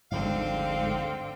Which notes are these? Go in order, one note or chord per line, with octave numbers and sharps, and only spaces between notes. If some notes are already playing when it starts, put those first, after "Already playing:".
G1 D2 G#2 D3 F3 C4 F5 G5